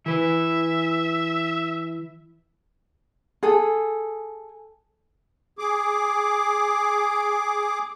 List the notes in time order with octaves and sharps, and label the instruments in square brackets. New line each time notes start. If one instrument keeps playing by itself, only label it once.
[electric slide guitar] E3 B4 [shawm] E5
[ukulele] G#4 A4
[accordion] G#4 D6